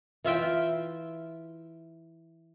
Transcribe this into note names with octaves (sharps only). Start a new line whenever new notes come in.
E3 F4 E5 G5